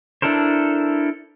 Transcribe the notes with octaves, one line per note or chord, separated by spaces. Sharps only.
D4 E4 A4 A#4 C5